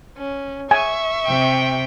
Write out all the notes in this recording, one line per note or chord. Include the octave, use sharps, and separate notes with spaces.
C#4
E5 G#5 C#6
C3 G5